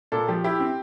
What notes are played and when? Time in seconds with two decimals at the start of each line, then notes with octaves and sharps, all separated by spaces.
0.12 A#2 A4
0.28 F3 G4
0.44 E4 G4
0.60 C4